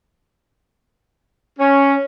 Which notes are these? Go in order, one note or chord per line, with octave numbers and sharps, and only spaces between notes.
C#4